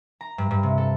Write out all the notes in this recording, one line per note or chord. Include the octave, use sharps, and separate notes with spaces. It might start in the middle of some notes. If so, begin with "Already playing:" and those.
A#5
G2
G2
C3
A4